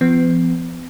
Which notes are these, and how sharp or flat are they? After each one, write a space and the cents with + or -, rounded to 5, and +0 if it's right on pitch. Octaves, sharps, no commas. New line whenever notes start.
F3 -35 B3 +40